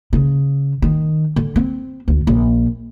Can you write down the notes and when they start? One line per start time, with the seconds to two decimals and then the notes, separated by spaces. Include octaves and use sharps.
0.13 C#3
0.82 D#3
1.36 D3
1.56 C4
2.08 D2
2.27 A#1